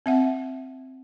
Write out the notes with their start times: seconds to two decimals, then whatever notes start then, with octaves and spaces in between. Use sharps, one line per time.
0.06 C4 E5 F#5